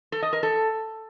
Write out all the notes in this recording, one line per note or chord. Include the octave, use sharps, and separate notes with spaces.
A4
D#5
A#4
A4